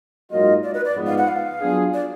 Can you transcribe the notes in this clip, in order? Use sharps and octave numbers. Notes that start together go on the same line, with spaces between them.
G#2 F#3 A#3 F4 D#5
D5
B4
D5
G#2 F3 G#3 B3
F5
F#5
F5
F#3 B3 D4 F4 G#4
D5